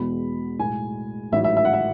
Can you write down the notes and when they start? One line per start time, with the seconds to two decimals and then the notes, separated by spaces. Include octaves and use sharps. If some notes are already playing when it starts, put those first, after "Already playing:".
Already playing: E2 B2 G#3 B3 B5
0.59 B1 A2 G#3 G#5
1.32 A1 G#2 F#3 E5
1.44 E5
1.57 E5
1.65 F#5
1.73 E5